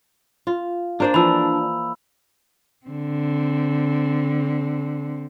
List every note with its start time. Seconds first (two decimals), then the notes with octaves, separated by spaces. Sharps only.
0.47 F4
1.00 A#3 D4 C5 D5
1.14 E3 F3 B5 E6
2.86 D3 C4